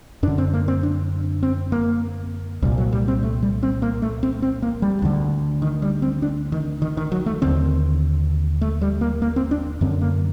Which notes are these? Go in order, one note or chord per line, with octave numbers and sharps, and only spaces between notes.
F#2 D3 D4
C4
A#3
C4
D4
C4
A#3
C2 A#2 G3
F#3
G3
C4
A3
G3
C4
A#3
A3
C4
C4
A#3
G3
D2 D3
D#3
G3
C4
D4
D#3
D#3
D#3
F#3
A3
D#2 D3 C4
A3
G3
A#3
A#3
C4
D4
F#2 D3 C4
A#3